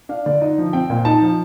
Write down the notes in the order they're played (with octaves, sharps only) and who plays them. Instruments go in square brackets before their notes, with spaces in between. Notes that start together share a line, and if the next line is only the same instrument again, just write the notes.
[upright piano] D4 F5
D3 D5
D#4 D#5
F3
C4 G5
A#2
D#4 A5
F3